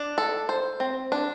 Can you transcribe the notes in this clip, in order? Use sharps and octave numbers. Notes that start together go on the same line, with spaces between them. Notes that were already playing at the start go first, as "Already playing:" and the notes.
Already playing: D4
A4
C5
C4
D4